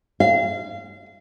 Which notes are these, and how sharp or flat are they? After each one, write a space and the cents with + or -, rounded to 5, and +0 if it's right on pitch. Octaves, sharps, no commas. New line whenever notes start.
F5 -30